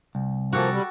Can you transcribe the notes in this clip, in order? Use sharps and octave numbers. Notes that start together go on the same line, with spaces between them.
C2
F3 A#3 F#4 G4 A4
G3